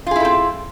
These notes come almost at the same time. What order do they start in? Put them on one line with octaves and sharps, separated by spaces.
F4 G#4 E4 A4 C4